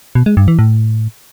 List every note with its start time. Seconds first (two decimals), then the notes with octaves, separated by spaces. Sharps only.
0.15 B2
0.26 G#3
0.37 G2
0.48 E3
0.59 A2